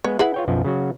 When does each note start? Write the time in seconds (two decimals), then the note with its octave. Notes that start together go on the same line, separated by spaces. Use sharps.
0.04 G#3 B3 C#5
0.19 E4 G#4 B4 F#5
0.34 F4 C#5 G5
0.48 B1 F#2 F3
0.65 C#3 F#3 F#4